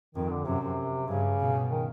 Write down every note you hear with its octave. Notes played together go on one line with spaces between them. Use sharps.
F2 D#3
D3
F#2 C3
C3
G2 C#3
B2
D#3